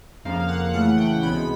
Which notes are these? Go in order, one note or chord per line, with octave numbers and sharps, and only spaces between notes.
F2 C#3 F3 A#3 F5
F5
F#5
C#3 E3 A3 F#5
G5
C2 B2 G#3 B3 B5